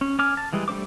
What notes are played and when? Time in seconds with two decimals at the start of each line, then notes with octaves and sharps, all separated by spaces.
0.01 C#4
0.19 C#4 G#5 D6 F6
0.37 A5
0.53 E3 G3 G#3
0.68 G3 A3 D4 C5 D6